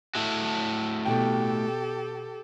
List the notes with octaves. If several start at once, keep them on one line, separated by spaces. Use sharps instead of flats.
A3 E4 F#4
B2 G4 A4 G5